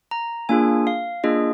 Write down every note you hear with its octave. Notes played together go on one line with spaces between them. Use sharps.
A#5
A#3 D4 F4 G#4 G#5
F5
A#3 D4 F4 G#4 D#5